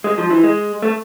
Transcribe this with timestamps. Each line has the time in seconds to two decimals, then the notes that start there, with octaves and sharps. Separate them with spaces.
0.04 G#3
0.18 F3
0.30 E3
0.44 G#3
0.82 A3